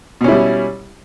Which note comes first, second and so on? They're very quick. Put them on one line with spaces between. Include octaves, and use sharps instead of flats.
B2 C#4 E4 G3